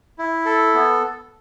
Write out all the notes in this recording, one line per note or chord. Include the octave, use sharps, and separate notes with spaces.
E4
A4
B3